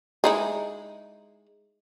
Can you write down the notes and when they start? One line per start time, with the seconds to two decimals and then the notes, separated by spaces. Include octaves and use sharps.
0.24 G#3 D#4 E4